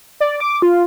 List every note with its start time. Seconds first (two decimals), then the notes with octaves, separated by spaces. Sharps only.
0.20 D5
0.40 D6
0.62 F4